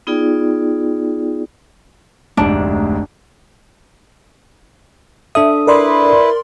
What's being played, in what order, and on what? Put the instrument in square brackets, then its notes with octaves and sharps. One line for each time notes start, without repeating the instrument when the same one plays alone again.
[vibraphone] B3 D#4 F4 G#4 D5 G5
[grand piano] F1 D2 G#2 [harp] D4
[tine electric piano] D4 A4 D#6 [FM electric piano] E5
[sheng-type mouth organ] E4 B4 [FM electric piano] A#4 D5 C6